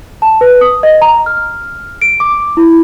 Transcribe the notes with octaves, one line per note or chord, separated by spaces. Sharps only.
A5
B4
D#6
D#5
A#5
F6
D7
D6
E4